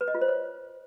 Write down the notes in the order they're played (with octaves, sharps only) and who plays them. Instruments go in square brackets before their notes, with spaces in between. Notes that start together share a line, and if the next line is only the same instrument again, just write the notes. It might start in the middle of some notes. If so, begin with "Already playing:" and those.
[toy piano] B4
D#5
F4
C5
C#5